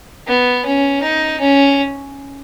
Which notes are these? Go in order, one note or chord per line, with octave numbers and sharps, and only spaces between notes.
B3
C#4
D#4
C#4